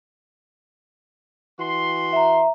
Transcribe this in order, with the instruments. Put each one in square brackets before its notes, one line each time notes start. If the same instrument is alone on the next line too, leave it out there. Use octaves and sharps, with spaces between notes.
[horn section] E3 F#4 C6
[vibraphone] E5 A#5